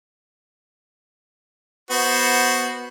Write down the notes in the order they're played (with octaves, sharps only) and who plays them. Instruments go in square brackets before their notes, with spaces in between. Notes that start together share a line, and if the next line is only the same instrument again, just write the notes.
[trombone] B3 [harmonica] F#4 C5